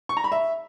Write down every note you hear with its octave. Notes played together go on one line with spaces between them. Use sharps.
C#6
A#5
B5
E5